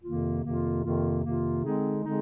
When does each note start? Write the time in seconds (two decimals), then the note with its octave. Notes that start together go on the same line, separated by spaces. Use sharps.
0.04 F2 C3 D#3 A#3 F4
0.44 F2 C3 D#3 A#3 F4
0.84 F2 C3 D#3 A#3 F4
1.24 F2 C3 D#3 A#3 F4
1.64 D3 G#3 C4 D#4 G#4
2.04 D3 G#3 C4 D#4 G#4